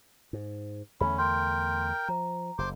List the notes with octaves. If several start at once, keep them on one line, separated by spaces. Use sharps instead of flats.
G#2
E2 D3 A3 C#4 B5
A#4 G5 C6
F3 A#5
F#1 C5 C6 D6